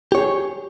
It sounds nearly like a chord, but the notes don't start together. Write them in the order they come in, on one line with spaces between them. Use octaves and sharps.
G4 C#5 G#4